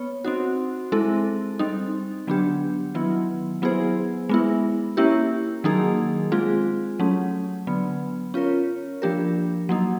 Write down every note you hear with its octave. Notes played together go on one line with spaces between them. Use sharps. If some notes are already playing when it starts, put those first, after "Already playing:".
Already playing: B3 C#5
C4 D#4 F#4
G#3 C4 E4 A4
G3 C4 D#4
D3 F#3 B3 D4 G4
D#3 F#3 B3 E4
F#3 B3 E4 G#4 C5
G#3 B3 E4
A#3 C#4 E4 G4
D#3 F#3 A#3 D#4 G#4
G#3 C4 F4 G#4
F#3 A3 C#4
D3 F#3 B3
C#4 F4 A#4 C#5
F3 A#3 D4 G4 A#4
F#3 A#3 D#4